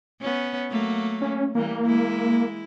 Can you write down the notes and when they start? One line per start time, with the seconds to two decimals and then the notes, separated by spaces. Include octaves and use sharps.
0.22 B3 C#4
0.70 F#3 A3 A#3
1.22 C#4
1.55 E3 G3 A#3
1.85 G#3 E4